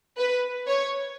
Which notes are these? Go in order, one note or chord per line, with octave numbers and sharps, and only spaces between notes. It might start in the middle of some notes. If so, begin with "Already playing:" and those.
B4
C#5